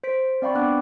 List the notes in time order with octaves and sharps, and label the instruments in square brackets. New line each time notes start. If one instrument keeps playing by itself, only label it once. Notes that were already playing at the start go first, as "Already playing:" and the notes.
[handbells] C5 B6 D7
C4 D5 F5 G5 B5 C#6
B3 D4 F#5 G5 D6 F#6